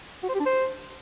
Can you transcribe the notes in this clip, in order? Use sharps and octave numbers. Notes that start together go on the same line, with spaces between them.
F#4
C5
G4
D4
C5